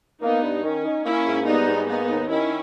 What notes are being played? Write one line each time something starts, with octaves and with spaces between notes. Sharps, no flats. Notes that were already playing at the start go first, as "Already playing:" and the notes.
A#3 B3 D#4
G2
D#3 C#4
D#4
A#3 C#4 E4
G#2
G3 B3 D#4
G#2
A#3 B3 D#4
D#2
D#3 C#4 E4